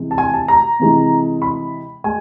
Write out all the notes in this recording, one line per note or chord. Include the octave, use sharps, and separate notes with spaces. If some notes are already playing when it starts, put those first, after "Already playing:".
Already playing: C3 E3 G#3
A5
G#5
A5
A#5
C3 E3 G#3
B5
G#3 G#5